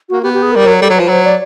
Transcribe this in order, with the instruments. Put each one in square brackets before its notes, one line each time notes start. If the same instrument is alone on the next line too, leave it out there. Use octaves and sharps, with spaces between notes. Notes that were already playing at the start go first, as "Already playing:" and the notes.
[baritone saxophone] A#3 [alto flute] F#4
[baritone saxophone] B3 [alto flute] G4
[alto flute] G4
G#4
[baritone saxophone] G3 [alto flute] A#4
[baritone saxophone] F#3
[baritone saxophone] G3 [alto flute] A4
[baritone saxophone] F#3
[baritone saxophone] F3 [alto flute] B4
[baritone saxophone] F#3 [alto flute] C5
[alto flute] D5